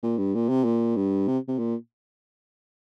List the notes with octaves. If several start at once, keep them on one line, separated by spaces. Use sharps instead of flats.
A#2
G2
A#2
C3
A#2
G2
C3
C3
A#2